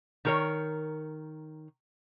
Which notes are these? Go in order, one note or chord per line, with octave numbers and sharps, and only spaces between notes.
D#3 A#4 C#5